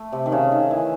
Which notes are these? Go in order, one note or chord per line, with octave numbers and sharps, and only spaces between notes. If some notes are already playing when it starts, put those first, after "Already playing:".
Already playing: A3
C3
D#3
C#3
D#3
E3